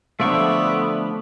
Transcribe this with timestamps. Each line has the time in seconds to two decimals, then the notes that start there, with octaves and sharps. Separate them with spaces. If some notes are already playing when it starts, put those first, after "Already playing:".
0.20 D3 F3 A3 B3 F4 D5 E5 C#6